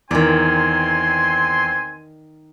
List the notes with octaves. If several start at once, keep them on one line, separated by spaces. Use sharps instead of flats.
E2 D#3 C4 D5 G#5 C6